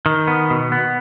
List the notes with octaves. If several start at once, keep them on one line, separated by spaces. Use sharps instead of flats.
D#3
B3
B2
B3